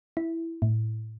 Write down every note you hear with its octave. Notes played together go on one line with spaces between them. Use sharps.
E4
A2